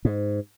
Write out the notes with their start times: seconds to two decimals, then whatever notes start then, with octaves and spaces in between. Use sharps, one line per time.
0.05 G#2